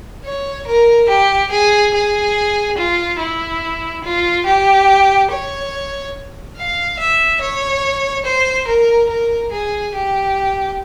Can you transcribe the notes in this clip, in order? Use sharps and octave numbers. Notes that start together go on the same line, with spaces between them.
C#5
A#4
G4
G#4
G#4
F4
E4
F4
G4
C#5
F5
E5
C#5
C5
A#4
A#4
G#4
G4